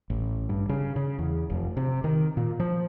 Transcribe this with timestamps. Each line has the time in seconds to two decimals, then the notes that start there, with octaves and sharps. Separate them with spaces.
0.10 A1
0.49 G2
0.69 C#3
0.96 C#3
1.18 E2
1.50 F1
1.77 C3
2.04 D#3
2.37 A#2
2.60 F3